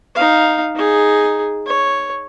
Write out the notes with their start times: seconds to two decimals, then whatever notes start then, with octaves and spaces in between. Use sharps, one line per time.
0.15 D#4 F5
0.76 D#4 G#4
1.66 C#5